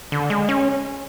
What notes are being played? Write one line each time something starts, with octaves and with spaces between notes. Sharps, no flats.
D3
G#3
C#4